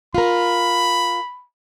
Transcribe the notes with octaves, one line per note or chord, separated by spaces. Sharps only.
F4 A#4 B5